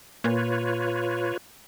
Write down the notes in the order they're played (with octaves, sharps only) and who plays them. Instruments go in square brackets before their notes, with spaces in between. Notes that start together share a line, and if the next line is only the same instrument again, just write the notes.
[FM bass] A#2 [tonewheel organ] F4 B4 C#5